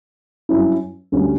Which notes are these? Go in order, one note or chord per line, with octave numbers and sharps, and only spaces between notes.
G2 F#3 C#4 E4
D2 D3 G3 C#4